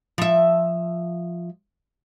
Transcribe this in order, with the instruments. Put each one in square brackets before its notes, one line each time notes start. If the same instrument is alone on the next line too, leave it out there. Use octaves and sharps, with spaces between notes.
[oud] F3 E5